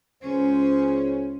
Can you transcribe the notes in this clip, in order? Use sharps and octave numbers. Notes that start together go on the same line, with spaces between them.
C#2 C#3 C#4 C5